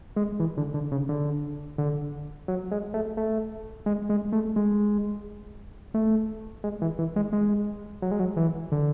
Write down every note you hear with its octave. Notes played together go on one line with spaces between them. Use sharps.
G#3
E3
D3
D3
C#3
D3
D3
F#3
G#3
A3
A3
G#3
G#3
A3
G#3
A3
G#3
E3
E3
G#3
G#3
F#3
G#3
F#3
E3
D3